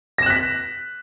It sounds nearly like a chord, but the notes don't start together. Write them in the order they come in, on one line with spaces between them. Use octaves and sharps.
A#6 E7 F#6 B6